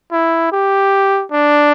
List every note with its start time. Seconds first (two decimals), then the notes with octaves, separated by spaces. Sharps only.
0.12 E4
0.52 G4
1.32 D4